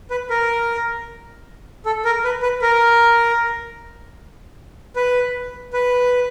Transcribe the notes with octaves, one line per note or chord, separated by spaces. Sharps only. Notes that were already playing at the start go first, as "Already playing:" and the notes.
B4
A#4
A4
A#4
B4
B4
A#4
B4
B4